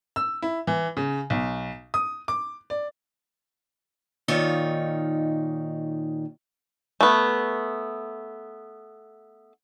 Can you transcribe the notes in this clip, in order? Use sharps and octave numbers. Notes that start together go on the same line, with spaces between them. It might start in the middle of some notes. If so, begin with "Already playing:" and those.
E6
E4
E3
C#3
B1
D#6
D6
D5
A#2 D#3 D#4 F4 C#5
A3 B3